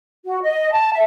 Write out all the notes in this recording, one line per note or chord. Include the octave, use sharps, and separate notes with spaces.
F#4
D#5
A5
E5